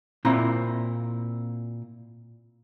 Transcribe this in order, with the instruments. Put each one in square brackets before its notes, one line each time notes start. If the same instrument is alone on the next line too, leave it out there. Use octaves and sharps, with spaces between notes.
[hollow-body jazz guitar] A#2 C4 E4 A#5